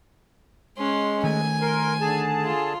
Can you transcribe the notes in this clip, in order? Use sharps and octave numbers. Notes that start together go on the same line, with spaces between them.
G#3 C#4 C6
D#3 A3 G#5
A#4 C6
D3 G#4 A5
F4